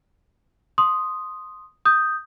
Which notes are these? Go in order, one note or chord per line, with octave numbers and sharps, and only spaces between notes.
C6 D#6
D#6 G6